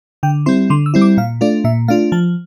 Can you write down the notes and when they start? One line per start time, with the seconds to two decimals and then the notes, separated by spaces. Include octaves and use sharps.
0.23 D3 G5
0.46 G3 C4 E4 C6
0.70 D3 C6
0.86 E6
0.94 G3 C4 E4
1.01 D6
1.17 A#2 F5
1.41 A3 D4 F4 D5
1.64 A#2 E5
1.88 A3 D4 F4 F5
2.12 F3 A5